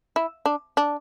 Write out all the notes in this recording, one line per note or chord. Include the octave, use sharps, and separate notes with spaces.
E4
D4
D4